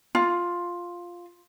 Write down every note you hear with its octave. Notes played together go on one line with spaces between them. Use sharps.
F4